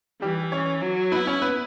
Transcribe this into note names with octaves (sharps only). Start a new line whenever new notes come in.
E3 G3 G4
C#4 C#5
F#3
B3 E4 B4
C#4 C#5
B3 B4